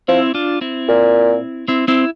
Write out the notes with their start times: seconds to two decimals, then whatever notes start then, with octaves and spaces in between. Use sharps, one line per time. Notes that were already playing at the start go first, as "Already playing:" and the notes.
0.08 F3 C4 E4
0.34 D4 F4
0.61 C4 E4
0.88 A#2
1.68 C4 E4
1.88 C4 E4